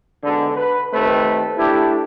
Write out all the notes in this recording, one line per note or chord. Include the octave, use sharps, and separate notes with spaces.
G#2 B2 D3
B4
D#2 D#3 A3 C4 B4
A3 D4 E4 G4